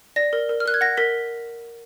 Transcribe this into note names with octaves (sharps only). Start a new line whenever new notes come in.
D5 A#6
A#4
A#4
F6
A#4 F#6
G#6
F#5 A#6
A#4 B6